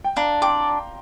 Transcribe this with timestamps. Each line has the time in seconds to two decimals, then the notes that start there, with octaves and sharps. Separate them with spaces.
0.04 G5
0.17 D4 F5 A#5
0.42 D5 G5 C6